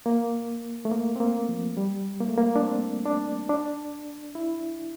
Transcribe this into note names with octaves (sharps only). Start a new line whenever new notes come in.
A#3
A3
A#3
C4
A#3
F3
G3
A#3
A3
A#3
D4
C4
D4
D4
E4